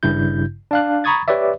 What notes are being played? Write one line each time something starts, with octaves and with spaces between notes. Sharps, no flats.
G#1 G2 C#3 E4 G6
D4 F5 F#6
A#5 B5 C#6 D#6 G#6 A6
G4 B4 C#5 D5 E5